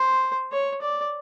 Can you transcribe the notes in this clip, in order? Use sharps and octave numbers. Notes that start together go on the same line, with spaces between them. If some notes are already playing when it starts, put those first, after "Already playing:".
Already playing: C5
C#5
D5